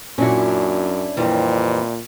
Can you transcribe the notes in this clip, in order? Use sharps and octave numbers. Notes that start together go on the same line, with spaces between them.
F#2 A#2 C#4 D4 E4 F#4
F2 A#2 E3 G3